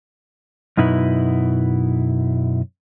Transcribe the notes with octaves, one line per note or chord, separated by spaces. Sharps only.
F#2 B2 D#4 E4 B4